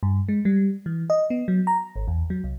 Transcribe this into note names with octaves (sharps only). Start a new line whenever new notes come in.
G2
G#3
G3
E3
D#5
B3
F#3
A#5
G#1
E2
F#3
C2